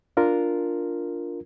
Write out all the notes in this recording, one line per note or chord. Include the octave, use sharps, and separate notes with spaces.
D4 F4 A#4